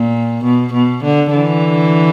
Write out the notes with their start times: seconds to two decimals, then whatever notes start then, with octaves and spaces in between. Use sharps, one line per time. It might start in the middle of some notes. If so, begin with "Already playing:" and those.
Already playing: A#2
0.44 B2
0.73 B2
1.04 D3
1.33 D3 E3